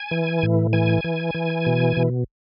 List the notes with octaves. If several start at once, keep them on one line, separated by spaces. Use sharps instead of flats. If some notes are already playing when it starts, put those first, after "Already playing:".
Already playing: G#5
E3
A2
E3 G#5
E3
E3
B2
B2